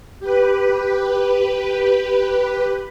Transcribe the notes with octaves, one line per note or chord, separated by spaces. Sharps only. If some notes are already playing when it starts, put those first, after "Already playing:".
G4 B4